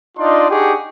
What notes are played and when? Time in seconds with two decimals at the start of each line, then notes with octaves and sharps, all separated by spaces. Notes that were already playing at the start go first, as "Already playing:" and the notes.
0.18 D4 D#4 F4 D5 D#5 C6
0.50 D4 D#4 G4 G#4 F#5 C#6